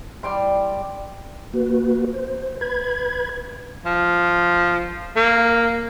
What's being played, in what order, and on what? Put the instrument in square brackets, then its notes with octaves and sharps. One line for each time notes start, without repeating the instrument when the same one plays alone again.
[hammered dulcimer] G3 G5 C6
[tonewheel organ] A#3 F#4 B4
C5
B4 B5 G#6
[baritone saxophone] F3
A#3